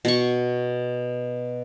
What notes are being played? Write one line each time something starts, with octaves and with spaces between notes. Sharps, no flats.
B2 C#6